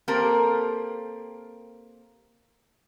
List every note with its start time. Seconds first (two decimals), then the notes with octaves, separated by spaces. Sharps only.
0.08 A#3 C4 G4 A4 A#4